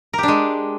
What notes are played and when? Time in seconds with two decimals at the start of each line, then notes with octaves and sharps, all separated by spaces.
0.13 A#4
0.18 G4
0.23 D4
0.28 G#3